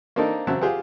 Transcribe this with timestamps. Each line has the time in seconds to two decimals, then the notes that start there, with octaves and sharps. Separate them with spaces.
0.16 A#3 C4 D4 D#4 A4 A#4
0.47 C#3 F#3 C4 E5 F#5 A5
0.62 F4 G4 G#4 C5 F#5